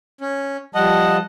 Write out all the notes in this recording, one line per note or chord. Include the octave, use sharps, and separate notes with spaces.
C#4
F3 G3 D#5 F#5 A5